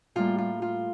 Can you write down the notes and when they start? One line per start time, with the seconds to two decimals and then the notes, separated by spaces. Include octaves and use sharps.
0.15 A2 G3 A#3 F4
0.38 F4
0.62 F4